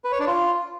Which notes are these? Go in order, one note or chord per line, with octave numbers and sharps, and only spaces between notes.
B4
C#5
D4
F4